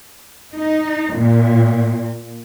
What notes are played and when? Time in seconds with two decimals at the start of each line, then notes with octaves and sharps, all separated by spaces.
0.54 D#4
1.13 A#2